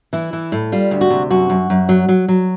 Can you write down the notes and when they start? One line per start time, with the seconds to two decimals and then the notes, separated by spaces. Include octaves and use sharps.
0.13 E3 E4
0.33 E3
0.52 A2
0.72 G3 F4
0.91 D2
1.01 F#4
1.10 C3
1.30 F#2 F#4
1.50 F#2
1.70 F#2
1.89 F#3
2.09 F#3
2.28 F#3